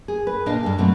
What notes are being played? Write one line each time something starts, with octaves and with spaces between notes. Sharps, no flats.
G#4
B4
A#2 A#3 D4 D#5 F5
G2 A4 F5
B2 F#3 A3 C4 C#4